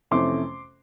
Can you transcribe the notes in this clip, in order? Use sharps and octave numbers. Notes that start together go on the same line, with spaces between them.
F2 C3 E3 A3 C#4 C6 D6